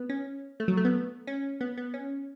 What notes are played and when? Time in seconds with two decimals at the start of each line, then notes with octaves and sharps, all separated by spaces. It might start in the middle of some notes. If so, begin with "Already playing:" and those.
Already playing: B3
0.09 C#4
0.60 A3
0.68 F#3
0.77 A3
0.85 B3
1.27 C#4
1.61 B3
1.77 B3
1.94 C#4